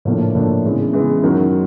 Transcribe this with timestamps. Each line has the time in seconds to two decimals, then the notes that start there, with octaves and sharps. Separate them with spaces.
0.05 A2 F3 A#3 D4
0.35 A2 F3 A#3 D4
0.64 C#3 E3 G#3 B3
0.93 C#3 E3 G#3 B3
1.23 F#2 D#3 F#3